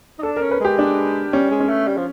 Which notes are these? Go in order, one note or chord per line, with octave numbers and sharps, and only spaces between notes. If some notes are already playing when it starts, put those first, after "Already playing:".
D#4
D4 A4
A#4
C#4
B4
G#3 G4
D4
G3 C#4
G#3
C#4
A3
G3
F3